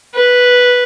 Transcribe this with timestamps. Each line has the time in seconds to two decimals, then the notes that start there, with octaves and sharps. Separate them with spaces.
0.15 B4